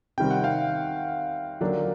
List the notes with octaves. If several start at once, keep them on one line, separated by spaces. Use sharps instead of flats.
C3 D#3 G3 C4 G5
F#5
F5 G5
D3 F#3 A#3 D4